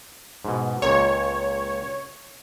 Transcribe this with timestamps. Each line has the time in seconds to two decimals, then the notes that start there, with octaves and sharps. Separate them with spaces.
0.45 G#2 B2
0.82 C#2 A#2 C#5